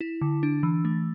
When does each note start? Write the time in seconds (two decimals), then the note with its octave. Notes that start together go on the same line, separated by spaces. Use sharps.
0.01 E4
0.21 D3
0.43 D4
0.63 E3
0.85 A3